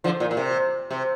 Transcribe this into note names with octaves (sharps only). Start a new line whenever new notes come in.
D3 F3
A#2
A#2
C3
C3